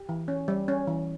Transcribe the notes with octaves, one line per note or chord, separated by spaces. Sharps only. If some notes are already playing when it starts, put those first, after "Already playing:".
Already playing: G4
E3
C#4
G3
C#4
E3